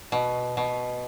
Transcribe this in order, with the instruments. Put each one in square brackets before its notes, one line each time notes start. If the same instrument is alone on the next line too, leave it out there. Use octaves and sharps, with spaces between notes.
[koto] B2
B2